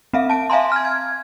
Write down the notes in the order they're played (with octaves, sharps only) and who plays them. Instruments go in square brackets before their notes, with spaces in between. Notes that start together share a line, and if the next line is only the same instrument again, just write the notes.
[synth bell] C4 E5 F5
A5 D7
E5 F5 G#5 A#5 C6
F6 G#6
G#6